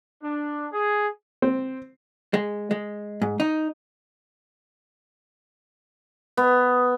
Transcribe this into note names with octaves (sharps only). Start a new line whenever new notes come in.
D4
G#4
C4
G#3
G#3
G#2
D#4
B3